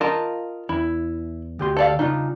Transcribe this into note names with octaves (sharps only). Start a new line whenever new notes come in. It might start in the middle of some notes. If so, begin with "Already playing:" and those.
F4 A#4 D#5 F5 A5
E2 E4
D2 G4 C6
A4 D5 F5
C#3 D4 D#4 F4